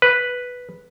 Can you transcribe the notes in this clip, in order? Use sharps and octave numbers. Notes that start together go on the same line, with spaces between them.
B4